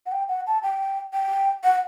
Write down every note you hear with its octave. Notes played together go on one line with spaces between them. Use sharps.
F#5
G5
F#5
A5
G5
G5
F#5